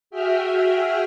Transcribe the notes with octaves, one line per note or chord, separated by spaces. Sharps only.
F#4 G#4 E5 G5 F6